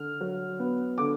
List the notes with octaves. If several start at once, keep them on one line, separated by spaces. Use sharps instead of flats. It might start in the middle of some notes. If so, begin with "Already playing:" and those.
Already playing: D3 F6
F#3
B3
D3 D6